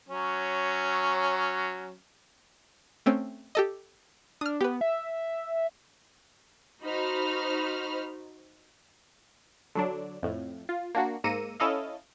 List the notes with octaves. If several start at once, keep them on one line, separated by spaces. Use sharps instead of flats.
F#3 C#4
A3 C4 C#4
G4 A4 D#5
D4 D#6 F6
B3 G4 B4
E5
D#4 F#4 C5 B5 F6
D3 F#3 D4
F2 A2
F4
A#3 D4 F#4
G#2 A#3 E6 A#6 C#7 D#7
C#4 E4 A4 D#5 F5